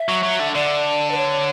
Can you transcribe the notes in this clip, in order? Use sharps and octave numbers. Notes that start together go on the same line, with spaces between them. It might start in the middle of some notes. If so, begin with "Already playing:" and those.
Already playing: E5
F#3
F#3
D3
D3 D5
B4
C#5